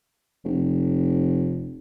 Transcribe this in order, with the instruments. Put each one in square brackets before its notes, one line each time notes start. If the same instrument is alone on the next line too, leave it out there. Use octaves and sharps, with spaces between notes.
[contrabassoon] F1